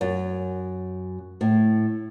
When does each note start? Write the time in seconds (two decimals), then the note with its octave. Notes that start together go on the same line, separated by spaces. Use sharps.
0.01 F#2
1.41 A2